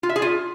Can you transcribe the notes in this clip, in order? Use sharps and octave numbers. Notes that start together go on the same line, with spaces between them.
F4
E5
G#4
F4